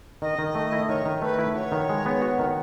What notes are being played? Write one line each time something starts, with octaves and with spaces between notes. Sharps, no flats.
D#3 D#5
D#3
A3
E4
D#3 C#5
D#3
A3 B4
E4
F#4 C#5
D#3
G#3
B3
F#4
D#3